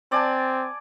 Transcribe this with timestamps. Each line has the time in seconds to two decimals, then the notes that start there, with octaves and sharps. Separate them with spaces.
0.12 C4 D5 G#5 A5